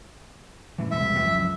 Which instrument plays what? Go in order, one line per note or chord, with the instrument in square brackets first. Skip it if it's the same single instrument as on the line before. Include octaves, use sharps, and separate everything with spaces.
[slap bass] A2 E3
[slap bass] E1 C2 G#3 [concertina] E5
[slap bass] C#2 F#2 F3